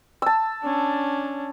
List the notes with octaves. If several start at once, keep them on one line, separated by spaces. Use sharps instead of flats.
A5 E6
C#4 D4